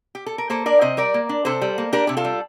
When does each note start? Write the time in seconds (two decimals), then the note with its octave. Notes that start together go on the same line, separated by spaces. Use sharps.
0.15 G4
0.26 A4
0.38 A#4
0.50 A#3 A4 C5
0.66 D4 A#4 D5
0.81 C3 C5 D#5
0.97 G3 A#4 D5
1.14 A#3
1.29 D4
1.45 C3 A4 C5
1.61 G3
1.78 A#3
1.93 D4 G4 A#4
2.07 C3 G4
2.17 F4 A4
2.24 G3